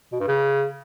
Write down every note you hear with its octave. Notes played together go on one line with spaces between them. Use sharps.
B2
G2
C#3